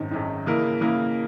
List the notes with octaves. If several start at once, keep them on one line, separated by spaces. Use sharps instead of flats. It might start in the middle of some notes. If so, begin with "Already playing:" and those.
Already playing: G#1 F#2 D#3
G#1 F#2 D#3
C#3 E3 A#3 E4 A#4
C#3 E3 A#3 E4 A#4